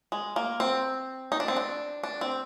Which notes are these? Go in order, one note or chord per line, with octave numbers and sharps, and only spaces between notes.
G#3
A#3
C4
D#4
D4
C4
D4
D4
C4